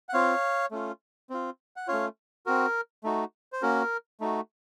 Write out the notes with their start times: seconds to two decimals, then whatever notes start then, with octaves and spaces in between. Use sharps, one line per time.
0.09 F#5
0.13 C4 F4 C#5 F5
0.71 A3 C#4 F4
1.30 C4 F4
1.76 F#5
1.88 A3 C#4 F4 C#5 F5
2.46 C4 F#4 A#4
3.04 A3 D#4 F#4
3.53 C5
3.62 A#3 C#4 F#4 A#4
4.20 A3 D#4 F#4